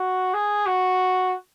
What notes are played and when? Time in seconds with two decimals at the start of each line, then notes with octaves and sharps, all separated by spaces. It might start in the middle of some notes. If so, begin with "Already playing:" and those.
Already playing: F#4
0.33 G#4
0.66 F#4